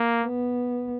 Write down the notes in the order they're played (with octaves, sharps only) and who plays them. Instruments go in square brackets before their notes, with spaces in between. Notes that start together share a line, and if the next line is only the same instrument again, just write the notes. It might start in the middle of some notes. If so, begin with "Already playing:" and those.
Already playing: [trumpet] A#3
[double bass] B3